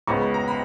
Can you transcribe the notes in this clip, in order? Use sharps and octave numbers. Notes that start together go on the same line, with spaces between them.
C#2 C#3 G#3 B3 C#6
B5
A#5
B5